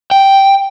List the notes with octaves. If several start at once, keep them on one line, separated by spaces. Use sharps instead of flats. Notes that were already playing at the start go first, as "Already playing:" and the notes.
G5